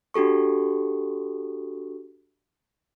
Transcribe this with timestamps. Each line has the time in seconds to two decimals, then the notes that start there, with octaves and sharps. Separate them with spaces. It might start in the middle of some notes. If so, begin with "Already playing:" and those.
0.14 D4 F#4 G4 A4 C#6